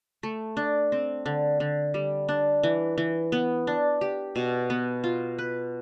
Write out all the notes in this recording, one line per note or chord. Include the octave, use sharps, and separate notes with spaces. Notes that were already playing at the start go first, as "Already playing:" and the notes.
A3
D4
C4
D3
D3
G3
D4
E3
E3
B3
D4
G4
B2
B3
F4
B4